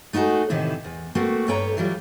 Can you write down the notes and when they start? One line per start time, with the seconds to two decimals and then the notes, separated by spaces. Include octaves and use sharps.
0.13 A3 D#4 E4 F#4 G#4
0.50 A2 C3 D#3 E3 E4
0.84 E2
1.15 A3 A#3 C4 F#4 B4
1.48 G2 A4 B4 C#5 G5 A#5
1.77 E3 F#3 G3 F4